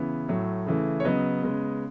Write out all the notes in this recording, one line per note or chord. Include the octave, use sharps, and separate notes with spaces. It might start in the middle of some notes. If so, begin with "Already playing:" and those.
Already playing: C#3 E3 B3
A2 F#3 A3
C#3 E3 A3
C#5
C#3 F#3 B3 D#5
C#3 G#3 B3